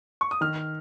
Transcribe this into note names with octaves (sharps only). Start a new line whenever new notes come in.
C#6
D#6
D#3 F6